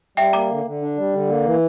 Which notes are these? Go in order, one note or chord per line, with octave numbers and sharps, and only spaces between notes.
G3 E5 G5
A#3 A#5 D6
D3
D3
D4
G3
D3
A#3
E3